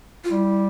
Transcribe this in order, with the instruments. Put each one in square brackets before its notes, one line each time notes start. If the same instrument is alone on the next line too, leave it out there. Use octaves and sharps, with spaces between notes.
[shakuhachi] F4
[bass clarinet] G3 [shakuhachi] E4